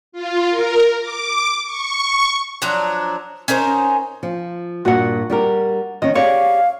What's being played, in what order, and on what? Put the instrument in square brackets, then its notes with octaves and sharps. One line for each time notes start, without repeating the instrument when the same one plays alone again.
[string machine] F4
A#4
D6
C#6
[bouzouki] F3 F#3 D4 A#5
C#4 D#4 A#4 C5
[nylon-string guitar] F3
[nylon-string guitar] G2 A#2 [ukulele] F#4 F#5
[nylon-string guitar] G3 G4 A#4
[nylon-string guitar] D#3 C#4 [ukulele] D#5
[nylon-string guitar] G4 G#4 D5 [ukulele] C#5 [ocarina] F5